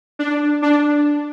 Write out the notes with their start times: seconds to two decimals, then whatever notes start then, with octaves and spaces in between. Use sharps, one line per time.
0.19 D4
0.62 D4